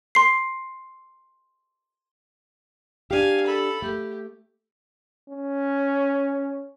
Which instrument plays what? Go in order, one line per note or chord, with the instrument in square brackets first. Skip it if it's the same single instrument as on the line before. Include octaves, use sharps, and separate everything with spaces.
[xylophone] C6 C7
[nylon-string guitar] D4 G4 [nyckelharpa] F5 G#5
[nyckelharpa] A4 B5
[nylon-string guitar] A3 [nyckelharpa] G4
[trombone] C#4